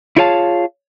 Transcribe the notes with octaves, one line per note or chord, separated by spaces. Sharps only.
E4 F4 G#4 C#5 F5 A5